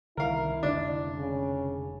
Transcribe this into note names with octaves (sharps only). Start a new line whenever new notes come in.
C2 D3 D#3 E4 A#4 F5
F1 B1 D3 D4
C#3